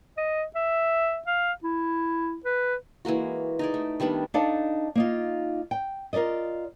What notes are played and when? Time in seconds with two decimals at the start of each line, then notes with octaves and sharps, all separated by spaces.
0.17 D#5
0.55 E5
1.27 F5
1.64 E4
2.45 B4
3.05 E3 G#3 A#3 F#4
3.59 D#4 G#4 D5
3.74 A3
4.00 D#3 G3 B3 D4
4.34 D4 D#4 A4 D5 F5 A5
4.95 A#3 D#4 F4
5.71 G5
6.13 F4 A#4 B4 D5 D#5